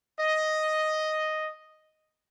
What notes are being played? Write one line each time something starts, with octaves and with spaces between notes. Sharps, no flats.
D#5